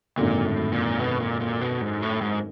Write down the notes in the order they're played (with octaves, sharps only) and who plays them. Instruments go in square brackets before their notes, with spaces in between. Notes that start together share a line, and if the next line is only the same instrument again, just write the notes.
[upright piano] G#1 F#2 D3 [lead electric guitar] A#2
[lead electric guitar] A2
A#2
B2
A#2
A#2
B2
G#2
A2
G#2